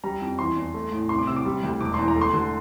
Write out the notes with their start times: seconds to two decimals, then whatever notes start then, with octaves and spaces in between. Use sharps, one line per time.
0.04 G3 A#5
0.21 F2
0.39 E3 C6
0.57 E2
0.74 A3
0.92 A2
1.09 C2 C6
1.19 D6
1.27 C3 E6
1.36 D6
1.45 G3
1.63 D2
1.81 E1 D6
1.94 E2 C6
2.08 A#5
2.16 A3
2.21 C6
2.33 D3